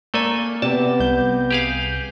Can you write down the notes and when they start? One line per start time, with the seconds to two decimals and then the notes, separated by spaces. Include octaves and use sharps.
0.14 A3 A#3 A4 A#4 D5 G#5
0.62 C3 B3 D5 A5
1.00 C2 G6
1.51 G4 G#4 F5